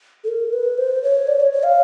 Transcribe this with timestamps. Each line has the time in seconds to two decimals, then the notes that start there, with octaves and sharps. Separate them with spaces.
0.24 A4
0.28 A#4
0.53 B4
0.78 C5
1.03 C#5
1.27 D5
1.40 C#5
1.52 C#5
1.64 F5